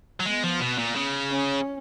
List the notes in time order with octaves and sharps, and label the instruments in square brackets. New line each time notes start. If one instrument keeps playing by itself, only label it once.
[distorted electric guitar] F#3
[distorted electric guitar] G#3 [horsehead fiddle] B3
[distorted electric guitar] F3
B2
A#2
C#3
[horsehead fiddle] C#4